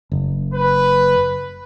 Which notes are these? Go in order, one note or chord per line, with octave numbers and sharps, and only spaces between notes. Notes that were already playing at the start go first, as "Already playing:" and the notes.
F#1
B4